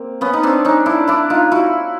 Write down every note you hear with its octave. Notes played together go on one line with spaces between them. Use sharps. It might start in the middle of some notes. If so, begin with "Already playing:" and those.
Already playing: A#3 C4
B3 C#4
D#4
C4 D4
C#4 D#4
D4 E4
D4 E4
D#4 F4
E4 F#4